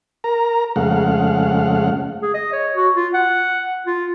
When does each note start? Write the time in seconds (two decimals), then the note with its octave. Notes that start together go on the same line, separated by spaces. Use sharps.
0.24 A#4 A#5
0.76 F2 C#3 G#3 A3 F5 F#5
2.22 G#4
2.34 D#5
2.53 C#5
2.76 F#4
2.96 F4
3.14 F#5
3.87 F4